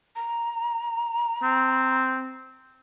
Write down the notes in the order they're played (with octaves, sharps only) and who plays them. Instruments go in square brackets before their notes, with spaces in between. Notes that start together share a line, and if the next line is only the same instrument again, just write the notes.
[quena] A#5
[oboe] C4